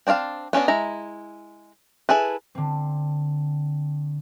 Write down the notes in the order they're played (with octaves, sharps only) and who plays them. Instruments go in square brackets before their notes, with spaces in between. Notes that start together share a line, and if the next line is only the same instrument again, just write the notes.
[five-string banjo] C4 D4 D5 F5 A5
B3 C#4 D4 F#4
G#3 E4 A#5
E4 G#4 A4 B4
[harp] D3 C4